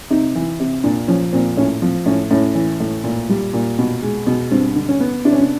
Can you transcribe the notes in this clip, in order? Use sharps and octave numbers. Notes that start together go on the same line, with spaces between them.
C3 D#4
E3
C3
A#2 D4
F3 C#4
A#2 C4
A2 C#4
F3 C4
A2 C#4
A2 C#4
E3
A2
A#2
G3
A#2
B2
G#3
B2
G2 C4
D3
C#4
B3
C3 D4
C#4
D4